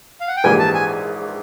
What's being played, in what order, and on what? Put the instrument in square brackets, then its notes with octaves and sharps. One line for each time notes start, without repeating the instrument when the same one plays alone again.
[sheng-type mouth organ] F5
F#5
G5
[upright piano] A#1 G#2 E3 G3 A#3 [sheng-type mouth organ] G#5
[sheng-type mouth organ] A5
G#5